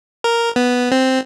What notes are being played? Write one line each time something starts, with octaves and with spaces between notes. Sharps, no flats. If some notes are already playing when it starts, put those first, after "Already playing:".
A#4
B3
C4